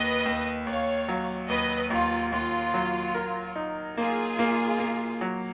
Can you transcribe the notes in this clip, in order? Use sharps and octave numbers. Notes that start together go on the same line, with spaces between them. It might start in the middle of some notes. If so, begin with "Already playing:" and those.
Already playing: D#2 B4 D#5
D#2
D#2 C#5 F5
F#3
D#2 B4 D#5
D#2 F4
D#2 F4
F#3
A#4
D#4
A#3 F4 G#4
A#3
A#3
F#3